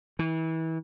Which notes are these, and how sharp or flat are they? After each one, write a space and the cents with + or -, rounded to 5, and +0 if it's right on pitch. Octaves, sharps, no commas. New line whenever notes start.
E3 -30